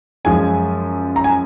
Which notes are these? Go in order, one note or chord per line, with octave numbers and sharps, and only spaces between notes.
F#2 F3 G#3 C#4 G#5
A#5
G#5